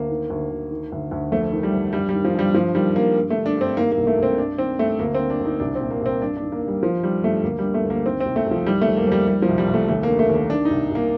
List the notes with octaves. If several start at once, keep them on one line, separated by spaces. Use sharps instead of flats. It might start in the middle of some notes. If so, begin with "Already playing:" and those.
Already playing: D2 A#3
D#3
D2
D2
D#3
D2
D2
F2 A3
D#3
G3
F2
G2 G3
D#3 G3
F3
G2 G3
G2 F3
D#3 G3
G2 A#3
G2
A3
D3
D4
G2 C4
D#3 A#3
A#3
C2
A3
C2 C4
G2 D4
D#3 C4
G2 A3
D2 A#3
C4
D3
D4
D2
D#4
C2 D4
C4
A#2
A#3
C2
C4
G2 D4
D4
D#3
A#3
G2
G3
G2 F3
D#3 G3
G2 A3
D2 A#3
G3
D3
A3
D2
A#3
D#3 C4
C2 C4
A3
C2
F3
D#3 G3
A3
F2
A#3
F2 G3
D#3 G3
F3
C2
G3
C2
A3
D#2 A3
A#3
D3
A3
D#2
A#3
D#3 D4
C2 D#4
C2 A#3